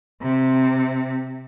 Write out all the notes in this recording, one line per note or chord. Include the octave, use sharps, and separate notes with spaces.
C3